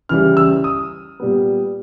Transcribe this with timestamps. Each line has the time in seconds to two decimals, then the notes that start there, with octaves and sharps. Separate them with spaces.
0.09 C#3 E3 G3 F6
0.37 E6
0.64 D#6
1.20 A#2 G3 B3